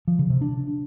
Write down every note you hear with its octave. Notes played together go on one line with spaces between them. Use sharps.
F3
C#3
C3
D4